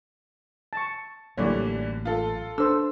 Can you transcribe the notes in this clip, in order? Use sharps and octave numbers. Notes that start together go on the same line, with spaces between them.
A5 C#6
A1 D3 E3 F#3 G3 A#3 C#5 D5
F4 A4
D4 A4 C5 E6